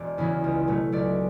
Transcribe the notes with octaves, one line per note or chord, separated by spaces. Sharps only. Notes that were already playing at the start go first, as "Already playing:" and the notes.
Already playing: E1 D5
E2 C#3 E3
C#2
B2 F#3 A3
C#2 D5